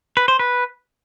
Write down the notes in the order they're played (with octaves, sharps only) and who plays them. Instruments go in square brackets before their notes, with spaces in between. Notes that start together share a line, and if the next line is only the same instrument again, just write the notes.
[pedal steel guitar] B4
C5
B4